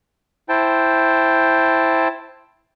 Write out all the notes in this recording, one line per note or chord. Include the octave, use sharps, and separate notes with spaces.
E4 C5 G5 A5